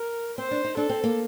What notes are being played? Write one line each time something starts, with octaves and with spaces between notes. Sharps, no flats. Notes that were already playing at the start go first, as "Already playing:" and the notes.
Already playing: A#4
C4 C5
D4
D#4
D4 A4
C4
A#3